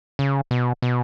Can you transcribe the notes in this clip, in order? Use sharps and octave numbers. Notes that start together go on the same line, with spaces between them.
C#3
B2
B2